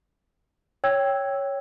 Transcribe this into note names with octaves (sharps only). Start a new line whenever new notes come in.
C#5 G5 E6 G#6